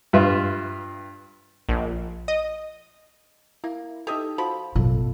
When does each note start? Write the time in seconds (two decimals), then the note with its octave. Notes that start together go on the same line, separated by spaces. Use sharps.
0.13 G2 F4 B4 E5
1.69 A#1
2.28 D#5
3.64 A#3 E4
4.07 D#4 G4 A4 D#5 E5
4.38 F3 F#4 B5
4.75 A1 F#2 B2 F4 A4